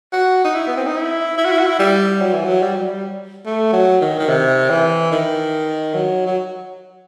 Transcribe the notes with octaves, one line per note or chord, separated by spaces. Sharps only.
F#4
D#4
E4
B3
C4
D#4
E4
E4
F#4
E4
F#4
E4
G3
F#3
E3
F#3
G3
F#3
G3
A3
F#3
D#3
D#3
C3
E3
D#3
F#3
F#3